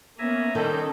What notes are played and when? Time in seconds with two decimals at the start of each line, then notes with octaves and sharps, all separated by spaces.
0.19 A#3 B3 C#4 E5 G#5 A#5
0.55 D#3 G3 C#4 A4 D#5 G6